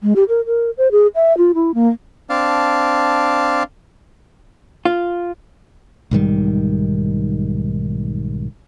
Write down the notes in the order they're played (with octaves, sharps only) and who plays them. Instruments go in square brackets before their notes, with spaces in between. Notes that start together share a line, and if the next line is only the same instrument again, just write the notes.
[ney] G#3
G4
A#4
A#4
C5
G#4
E5
F4
E4
A#3
[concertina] C4 D4 F5 A5
[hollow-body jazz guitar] F4
[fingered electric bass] B1 G#2 D#3 G3